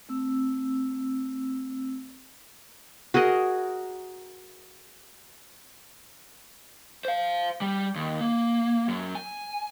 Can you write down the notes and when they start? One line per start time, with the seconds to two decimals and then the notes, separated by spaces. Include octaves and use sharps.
0.09 A3 C4 E6
3.14 F#4 G#4 A#4 D#5
7.05 C5 F5
7.62 G3
7.96 D#2
8.21 A#3
8.88 F#2
9.15 G#5